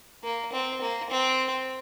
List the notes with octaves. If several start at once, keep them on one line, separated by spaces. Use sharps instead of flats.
A#3
C4
A#3
C4